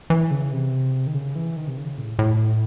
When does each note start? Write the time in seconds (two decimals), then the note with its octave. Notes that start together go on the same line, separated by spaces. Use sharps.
0.10 E3
0.31 C#3
0.52 C3
1.07 D#3
1.15 C#3
1.36 E3
1.56 D#3
1.68 C3
1.77 C#3
1.98 A2
2.19 A2